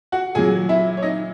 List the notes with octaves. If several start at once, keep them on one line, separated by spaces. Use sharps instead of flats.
F#4 F#5
A#2 F#3 G#4 G#5
E4 E5
C#5
D#4 D#5